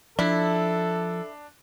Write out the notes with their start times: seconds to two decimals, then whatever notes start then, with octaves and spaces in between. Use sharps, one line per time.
0.19 F3 D4 E4 A4